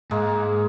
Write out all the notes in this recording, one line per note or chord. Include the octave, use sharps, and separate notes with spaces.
G#2 G#3 A#3